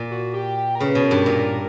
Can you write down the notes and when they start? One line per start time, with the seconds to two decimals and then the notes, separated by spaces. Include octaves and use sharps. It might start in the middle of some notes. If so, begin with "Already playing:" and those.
Already playing: A#2
0.11 F#4
0.34 G4
0.57 G4
0.75 A#4
0.80 C#3 B4
0.95 B2
1.03 A#4
1.11 G2
1.26 A#2 A#4